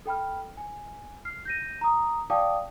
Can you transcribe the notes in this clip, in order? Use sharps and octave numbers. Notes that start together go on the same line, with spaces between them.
A4 G5 B5 F6
G#5
F6 C7
G6 A#6 D#7
A#5 D#6
D5 F5 G5 A5 D6 D#6